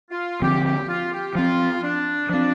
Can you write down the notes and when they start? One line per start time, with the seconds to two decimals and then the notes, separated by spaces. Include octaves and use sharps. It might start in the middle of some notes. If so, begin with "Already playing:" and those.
0.11 F4
0.42 D3 F3 C4 G4
0.65 G4
0.88 F4
1.12 G4
1.35 F3 C4 F4
1.83 D4
2.29 F3 C4 D4